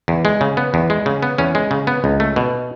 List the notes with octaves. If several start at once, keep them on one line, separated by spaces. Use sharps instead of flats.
E2
G#3
C#3
B3
E2
G#3
C#3
B3
E2 C#4
G#3
C#3
B3
C#2
A3
B2